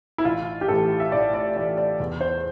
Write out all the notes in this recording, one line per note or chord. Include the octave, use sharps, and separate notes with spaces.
E4
A1 F4
G4
A2 E3 A4
E5
A1 D5
D5
A2 E3 D5
D5
E2
C5